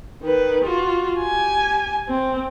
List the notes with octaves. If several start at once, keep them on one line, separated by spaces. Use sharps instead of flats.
D#3 B4
F4 F#4
G4 G#5
C4